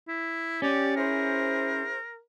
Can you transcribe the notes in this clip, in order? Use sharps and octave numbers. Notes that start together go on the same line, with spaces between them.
E4
C#4 G4 D5
E4 G#4 A#4 C5